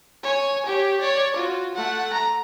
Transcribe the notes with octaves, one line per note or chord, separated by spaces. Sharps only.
C#5 G#5
G4 C#5
C#5 D5
F4 F#4
A3 F#5
A#5